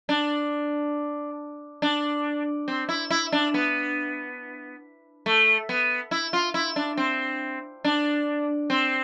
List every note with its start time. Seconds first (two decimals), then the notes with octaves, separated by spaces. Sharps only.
0.09 D4
1.82 D4
2.68 C4
2.89 E4
3.11 E4
3.32 D4
3.54 B3
5.26 A3
5.69 B3
6.11 E4
6.33 F4
6.54 E4
6.76 D4
6.98 C4
7.84 D4
8.70 C4